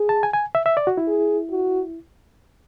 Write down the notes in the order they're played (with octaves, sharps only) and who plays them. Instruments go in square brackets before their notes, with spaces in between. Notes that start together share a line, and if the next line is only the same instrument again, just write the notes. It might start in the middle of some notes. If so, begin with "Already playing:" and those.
Already playing: [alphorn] G#4
[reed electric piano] A5
G#5
G#5
E5
E5
D5
F#4
E4
[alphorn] G#4
F#4